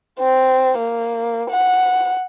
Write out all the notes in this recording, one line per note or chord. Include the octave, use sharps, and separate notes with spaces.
C4
A#3
F#5